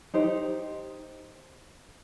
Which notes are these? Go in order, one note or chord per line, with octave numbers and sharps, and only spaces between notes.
D#4 G4 C5